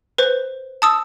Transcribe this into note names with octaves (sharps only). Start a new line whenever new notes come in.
B4 C5
A5 D#6 E6